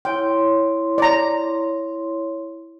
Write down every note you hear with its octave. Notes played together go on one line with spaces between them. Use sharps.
E4 C#5 G5 C6
D5 A#5